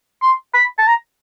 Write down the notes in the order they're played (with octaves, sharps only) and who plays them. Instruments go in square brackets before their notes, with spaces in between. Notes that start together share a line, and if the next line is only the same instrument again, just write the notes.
[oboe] C6
B5
A5
A#5